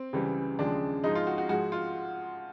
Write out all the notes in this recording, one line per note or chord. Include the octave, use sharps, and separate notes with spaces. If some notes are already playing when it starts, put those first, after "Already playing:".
Already playing: C4
C#2 C#3 E3 G3
D#2 C#3 F3 G#3 D4
G#2 F3 G#3 D#4
F4
F#4
F#4
G#2 F3 G#3 F#4
F4